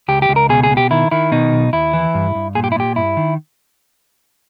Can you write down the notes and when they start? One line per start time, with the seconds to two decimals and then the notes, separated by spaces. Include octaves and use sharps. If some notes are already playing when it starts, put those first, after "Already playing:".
0.08 C#2 G4
0.22 G4
0.29 C#2
0.36 A#4
0.49 B2 G#4
0.64 G#4
0.71 B2
0.77 G4
0.91 D#3 E4
1.11 D#3 E4
1.32 B2 D#4
1.52 B1
1.73 D#2 E4
1.94 E3
2.14 G2
2.35 G2
2.55 A#2 G#4
2.64 G4
2.72 E4
2.76 A#2 G4
2.96 G2 E4
3.17 D#3